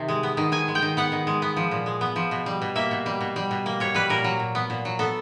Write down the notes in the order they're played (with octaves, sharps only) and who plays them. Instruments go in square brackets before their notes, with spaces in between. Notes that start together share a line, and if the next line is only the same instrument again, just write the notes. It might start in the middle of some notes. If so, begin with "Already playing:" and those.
Already playing: [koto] C3 D#3
G#3
B3
D#3
D#3 G#5
G#3
G5
D#3
B3 F#5
D#3
G#3
B3
F3
A#2
G#3
B3
F3
B2
G3
B2
A#3 E5
B2
G3
B2
G3
B2
A#3
B2 C#5
G3 B4
A#2 A#4
F#3
A#2
B3
A#2
F#3
B3 A4